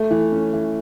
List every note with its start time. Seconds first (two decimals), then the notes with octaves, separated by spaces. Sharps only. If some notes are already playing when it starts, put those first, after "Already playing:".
Already playing: A3
0.11 E3
0.32 C#4
0.53 E3